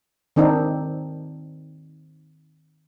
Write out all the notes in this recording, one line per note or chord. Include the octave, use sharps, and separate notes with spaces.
D#3 C4 D4 D#4